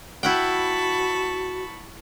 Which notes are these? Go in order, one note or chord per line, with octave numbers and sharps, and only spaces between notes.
E4 F#4 F#5 G5 A5 B5 C#6